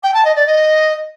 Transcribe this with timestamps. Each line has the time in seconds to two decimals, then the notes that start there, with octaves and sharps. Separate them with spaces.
0.03 G5
0.13 A5
0.24 D#5
0.35 D5
0.46 D#5